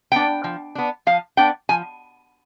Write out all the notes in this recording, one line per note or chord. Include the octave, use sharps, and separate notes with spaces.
B3 D4 G5
F3
B3 D4
F3 F5
B3 D4 G5
F3 G#5